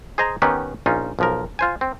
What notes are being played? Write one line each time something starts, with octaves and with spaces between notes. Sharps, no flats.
G#4 C5 D#5 G#5 A#5
D#3 B3 C#4 D#4 G4 B4
A#1 C#4 D#4 F4
B1 F3 A#4
F4 C5 G#5
C4